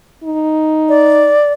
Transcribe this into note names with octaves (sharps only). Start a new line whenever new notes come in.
D#4
D5